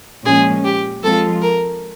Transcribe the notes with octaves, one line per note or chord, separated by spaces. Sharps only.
A#2 F3 G#3 C#4 G#4
G4
F3 G#3 C4 F4 A4
A#4